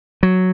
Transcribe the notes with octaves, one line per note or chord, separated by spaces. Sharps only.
F#3